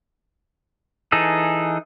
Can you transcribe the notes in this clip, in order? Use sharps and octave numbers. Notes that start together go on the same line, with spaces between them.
E3 D#4 G#4 A4